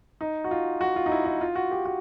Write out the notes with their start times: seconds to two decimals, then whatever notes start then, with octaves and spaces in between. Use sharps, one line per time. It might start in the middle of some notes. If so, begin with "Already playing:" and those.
0.21 D#4
0.44 F#4
0.51 F4
0.81 F#4
0.96 F4
1.06 D#4
1.11 E4
1.25 D#4
1.41 F4
1.56 F#4
1.71 G4
1.86 F#4